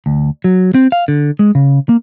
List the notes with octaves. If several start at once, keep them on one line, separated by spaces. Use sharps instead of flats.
D2
F#3
C4
F5
D3
G#3
C#3
A#3